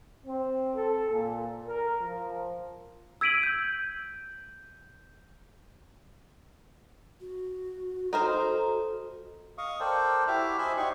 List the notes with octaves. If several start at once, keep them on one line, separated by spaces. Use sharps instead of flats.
C4
A4
A#2
A#4
F3
E6 G#6 B6 D7 D#7 F#7
G6
F#4
D#4 A4 A#4 C5
D#5 F5 C#6 D#6
A4 A#4 C5 D5 G5
E4 F#4 G4 E5 D6 F6
C5 D#5 E5 G#5 B5 C6
D#4 F#4 G4 D5 C6 C#6